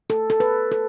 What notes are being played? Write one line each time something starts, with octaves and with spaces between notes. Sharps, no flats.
A4
A4
B4
A4